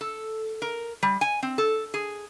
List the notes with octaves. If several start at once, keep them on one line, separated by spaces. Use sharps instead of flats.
A4
A#4
G3
G#5
C4
A4
G#4